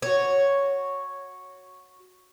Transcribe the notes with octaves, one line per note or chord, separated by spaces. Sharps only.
F#4 C#5